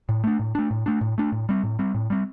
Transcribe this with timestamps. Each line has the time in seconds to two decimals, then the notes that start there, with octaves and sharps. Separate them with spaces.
0.09 A2
0.24 A3 D4
0.39 A2
0.55 A3 D4
0.71 A2
0.86 A3 D4
1.01 A2
1.18 A3 D4
1.32 A2
1.49 G3 C4
1.63 A2
1.79 G3 C4
1.95 A2
2.10 G3 C4